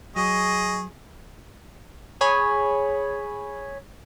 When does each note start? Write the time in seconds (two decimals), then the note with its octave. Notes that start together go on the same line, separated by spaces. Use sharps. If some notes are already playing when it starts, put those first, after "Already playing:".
0.16 F#3 G#4 D#5 C#6
2.21 G#4 C#5 G#5 B5